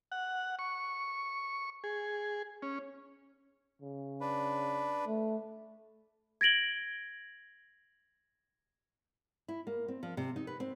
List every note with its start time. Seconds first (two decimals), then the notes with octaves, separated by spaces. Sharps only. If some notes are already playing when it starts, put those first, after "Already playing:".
0.12 F#5
0.59 C#6
1.84 G#4
2.62 C#4
3.82 C#3
4.21 D4 B4
5.06 A3
6.41 G#6 A#6 D7 F#7 G7
9.48 E4
9.67 A#3
9.88 C4
10.03 F3
10.17 C3
10.36 D#4
10.47 B4
10.60 C4